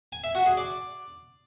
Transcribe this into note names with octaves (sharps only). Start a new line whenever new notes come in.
G#5
E5
F#4
G#4
D5